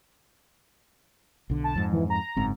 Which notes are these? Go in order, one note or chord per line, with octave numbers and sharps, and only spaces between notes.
B1 D3
A5
F2 G#2
E3
A#5
F#1 G#2 C4